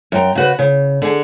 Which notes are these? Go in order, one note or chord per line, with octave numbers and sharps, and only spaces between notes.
F#2 G5 A#5
C#3 F#4 B4
C#3
D3 G#4